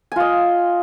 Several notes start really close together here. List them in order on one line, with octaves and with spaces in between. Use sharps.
G#5 F4 D#5